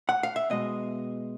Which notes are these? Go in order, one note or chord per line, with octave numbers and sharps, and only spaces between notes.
F#5
F5
E5
B2 G#3 D#5